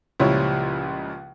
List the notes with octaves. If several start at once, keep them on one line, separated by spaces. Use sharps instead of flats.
C#2 A#2 F3 G3 E4 C#5